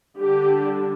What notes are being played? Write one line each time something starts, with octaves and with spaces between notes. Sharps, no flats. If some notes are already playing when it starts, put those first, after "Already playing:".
D3 G3 D4 G4